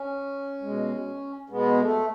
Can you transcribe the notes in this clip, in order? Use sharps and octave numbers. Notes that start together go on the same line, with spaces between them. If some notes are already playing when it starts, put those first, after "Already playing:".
Already playing: C#4
B2 G#3
B2 G#3 B3
A3